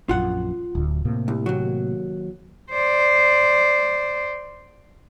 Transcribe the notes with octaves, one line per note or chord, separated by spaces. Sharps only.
A#1 F#2 F4 F#5
D1 D2
A2 C3 A#3
C2
D#2 F#3
C5 D5